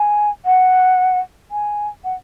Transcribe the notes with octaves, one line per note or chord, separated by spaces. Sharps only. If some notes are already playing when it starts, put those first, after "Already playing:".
Already playing: G#5
F#5
G#5
F#5